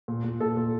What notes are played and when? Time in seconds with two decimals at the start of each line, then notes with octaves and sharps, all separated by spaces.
0.08 A#2
0.24 A#2
0.40 A#2 A4
0.57 A#2